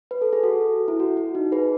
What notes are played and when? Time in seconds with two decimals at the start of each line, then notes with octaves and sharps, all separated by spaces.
0.11 B4
0.21 A4
0.33 G#4
0.43 F#4 A4
0.88 E4
1.00 F#4
1.17 F#4
1.35 D#4
1.52 G#4 B4